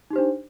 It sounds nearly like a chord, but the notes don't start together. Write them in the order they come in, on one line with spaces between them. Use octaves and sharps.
D#4 G4 C5 D4